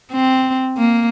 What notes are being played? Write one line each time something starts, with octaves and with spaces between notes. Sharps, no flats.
C4
A#3